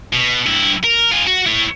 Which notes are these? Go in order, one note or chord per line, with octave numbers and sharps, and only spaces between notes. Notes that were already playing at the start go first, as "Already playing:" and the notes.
B2
G2 E4
A#4
F4 G#4
F#4
E4 C#5